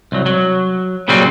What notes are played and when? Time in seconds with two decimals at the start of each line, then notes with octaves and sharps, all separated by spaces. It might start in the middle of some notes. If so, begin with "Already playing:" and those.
0.12 C2 F#3
0.26 F#3
1.08 A#2 C#3 F#3 G3 C4